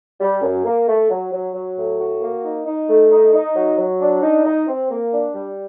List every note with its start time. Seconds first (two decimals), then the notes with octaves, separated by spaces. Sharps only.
0.20 G3
0.42 F#2
0.65 A#3
0.87 A3
1.09 F#3
1.32 F#3
1.54 F#3
1.77 A2
1.99 F#4
2.21 A#3
2.43 D#4
2.66 D#4
2.89 A3
3.11 D#4
3.33 D#4
3.55 F#3
3.78 F#3
4.00 D4
4.22 D#4
4.45 D#4
4.67 C4
4.90 A#3
5.13 D4
5.34 G3